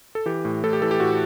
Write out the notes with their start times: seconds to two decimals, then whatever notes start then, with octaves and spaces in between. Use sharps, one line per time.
0.15 A4
0.26 E3 G4
0.45 A2
0.63 A2 A4
0.73 G4
0.82 E3 A4
0.91 G4
1.00 A2 F#4